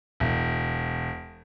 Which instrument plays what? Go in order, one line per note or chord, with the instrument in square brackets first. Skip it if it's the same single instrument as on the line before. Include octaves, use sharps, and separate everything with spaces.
[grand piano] E1